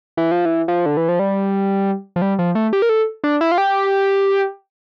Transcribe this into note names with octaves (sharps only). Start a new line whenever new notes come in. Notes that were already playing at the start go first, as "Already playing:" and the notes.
E3
F3
E3
F3
D3
E3
F3
G3
F3
G3
F3
A3
G4
A#4
A4
D4
E4
F4
G4